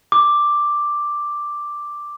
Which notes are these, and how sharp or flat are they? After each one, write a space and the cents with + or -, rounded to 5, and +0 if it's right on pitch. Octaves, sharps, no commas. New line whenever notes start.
D6 +5